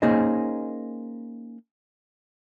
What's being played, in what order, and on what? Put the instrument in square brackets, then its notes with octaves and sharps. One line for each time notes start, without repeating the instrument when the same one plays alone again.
[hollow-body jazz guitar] A#3 C#4 D#4 G#4 C5 D#5